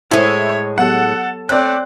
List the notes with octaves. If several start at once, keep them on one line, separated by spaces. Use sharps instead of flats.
A2 G#3 E4 A4 C5 C#5
F#3 B3 G4 A4 F#5
A3 C4 C#5 D5 F#6